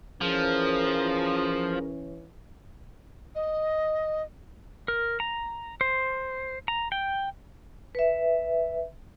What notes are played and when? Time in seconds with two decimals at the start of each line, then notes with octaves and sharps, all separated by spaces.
0.21 E3 F3 C#4 G#4 A#4
3.34 D#5
4.88 A#4
5.20 A#5
5.81 C5
6.68 A#5
6.92 G5
7.95 B4 E5